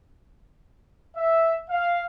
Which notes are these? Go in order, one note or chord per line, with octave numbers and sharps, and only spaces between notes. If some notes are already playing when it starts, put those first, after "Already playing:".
E5
F5